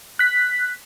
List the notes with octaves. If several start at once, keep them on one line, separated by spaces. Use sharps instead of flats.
F#6 B6